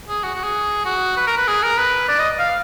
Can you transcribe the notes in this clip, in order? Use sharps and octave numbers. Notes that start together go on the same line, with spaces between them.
G#4
F#4
F#4
G#4
F#4
B4
A#4
B4
G#4
A#4
B4
D5
D#5
F5